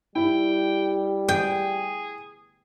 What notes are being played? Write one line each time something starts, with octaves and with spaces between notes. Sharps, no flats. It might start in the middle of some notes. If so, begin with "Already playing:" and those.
G3 E4 G5
G#4 G5